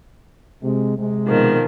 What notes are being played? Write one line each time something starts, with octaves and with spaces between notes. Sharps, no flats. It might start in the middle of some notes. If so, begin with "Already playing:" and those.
C3 G#3
C3 G#3
B2 D#3 F3